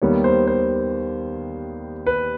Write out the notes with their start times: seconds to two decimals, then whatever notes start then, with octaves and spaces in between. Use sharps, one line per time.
0.02 D#2 D#3 G3 B3 C#5
0.24 C5
0.47 C5
2.06 B4